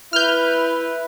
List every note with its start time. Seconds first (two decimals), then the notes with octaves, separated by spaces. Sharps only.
0.13 E4 B4 F6 G6